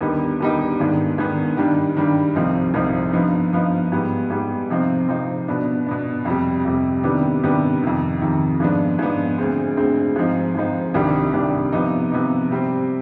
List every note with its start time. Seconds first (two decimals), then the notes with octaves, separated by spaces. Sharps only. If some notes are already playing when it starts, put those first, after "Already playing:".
0.01 D#2 D3 G3 B3 D#4
0.40 D#2 D3 G3 B3 D#4
0.79 G#2 D#3 B3 D4
1.18 G#2 D#3 B3 D4
1.57 G2 D#3 G3 D4
1.96 G2 D#3 G3 D4
2.35 C2 C3 F3 C4 D#4
2.74 C2 C3 F3 C4 D#4
3.13 G2 F3 B3 D#4
3.53 G2 F3 B3 D#4
3.92 G#2 G3 B3
4.30 G#2 G3 B3
4.70 C3 F3 C4 D#4
5.08 C3 F3 C4 D#4
5.48 B2 B3 D4
5.86 B2 B3 D4
6.25 F2 C3 G3
6.65 F2 C3 G3
7.03 C3 D#3 G3 B3 D4
7.43 C3 D#3 G3 B3 D4
7.82 F2 C3 D#3
8.22 F2 C3 D#3
8.60 G#2 F3 B3 D4
8.99 G#2 F3 B3 D4
9.38 D2 D3 G#3 C4
9.77 D2 D3 G#3 C4
10.16 G#2 F3 C4 D#4
10.55 G#2 F3 C4 D#4
10.94 C2 C3 D#3 G3 D4
11.33 C2 C3 D#3 G3 D4
11.72 C3 F3 B3 D#4
12.11 C3 F3 B3 D#4
12.50 C3 G3 C4